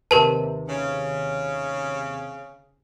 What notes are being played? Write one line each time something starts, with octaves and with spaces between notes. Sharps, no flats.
D#2 C3 G4 A#4 B4 A5
C#3